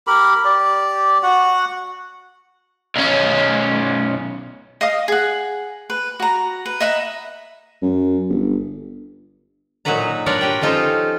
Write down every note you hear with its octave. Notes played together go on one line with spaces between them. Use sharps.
G4 A#4 B5
G4 D5
F#4 F#5
B1 C#4
D#5 F5 D#6
G#4 F#5
B4
F#4 A#5
B4
D#5 E5 F#5 A#5
F#2
G1
A#2 F#3 D#4 F#4 B4 A#5
D4 F4 A#4 B4 C#5 D5
G4 C#5 G5
F3 C#4 D#4 F4 A4 C5